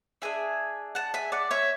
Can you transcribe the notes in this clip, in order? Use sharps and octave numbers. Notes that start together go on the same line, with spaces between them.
D4 G#4 E5 G#5
F#5 A5
E5 G#5
D5 F#5
C#5 E5